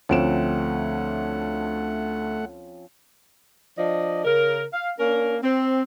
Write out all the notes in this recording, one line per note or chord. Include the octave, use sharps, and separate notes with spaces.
D2 F3 A3 C4 C#4 F#5 D7 E7
F3 D4 D5 D#5
C#3 A#4
F5
A#3 C#4 D4 A#4
C4